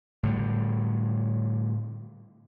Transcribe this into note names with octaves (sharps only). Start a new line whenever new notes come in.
A2 D3 G3